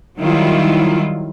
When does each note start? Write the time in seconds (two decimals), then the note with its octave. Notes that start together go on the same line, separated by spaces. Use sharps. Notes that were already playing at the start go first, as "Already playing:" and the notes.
0.18 D#3 F#3 G3 E4 F4